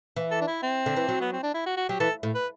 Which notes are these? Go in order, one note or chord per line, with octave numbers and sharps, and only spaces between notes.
E3
A4
D4
E4
C4
D3
E3
F#3
B3
C4
D4
E4
F#4
F#4
F#3 G4
E3 A4
A2
B4